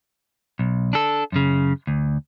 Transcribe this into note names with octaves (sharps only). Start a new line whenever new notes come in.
B1
D4 A4
F#2 C#3
D2